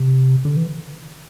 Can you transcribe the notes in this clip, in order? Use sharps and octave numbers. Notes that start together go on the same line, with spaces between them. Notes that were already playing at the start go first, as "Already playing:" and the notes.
Already playing: C3
D3
E3